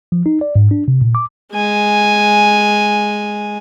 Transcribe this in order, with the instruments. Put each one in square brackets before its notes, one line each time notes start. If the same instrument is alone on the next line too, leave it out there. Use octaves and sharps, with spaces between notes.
[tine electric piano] F3
D#4
D5
G#2
D4
C3
A#2
D6
[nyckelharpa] G#3 G#5